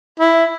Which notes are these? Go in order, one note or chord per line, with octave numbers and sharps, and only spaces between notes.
E4